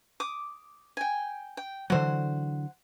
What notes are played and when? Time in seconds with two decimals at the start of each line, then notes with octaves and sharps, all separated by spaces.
0.20 D6 D#6
0.97 G5 G#5
1.57 G5
1.90 D3 E3 F#3 C5 F#5